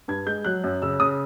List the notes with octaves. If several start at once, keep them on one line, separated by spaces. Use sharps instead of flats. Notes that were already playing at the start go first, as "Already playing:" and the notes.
G2 G#6
G#3 G6
F#3 F#6
F#2
C#3 E6
C#3 D#6